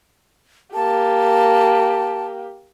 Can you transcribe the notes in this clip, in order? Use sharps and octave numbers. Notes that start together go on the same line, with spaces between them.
A#3 G4 A5